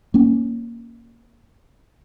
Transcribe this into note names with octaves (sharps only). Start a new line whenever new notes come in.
A#3 C#4